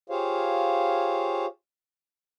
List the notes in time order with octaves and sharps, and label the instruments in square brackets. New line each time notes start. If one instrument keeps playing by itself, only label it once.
[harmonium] F4 G4 G#4 C5 C#5 F5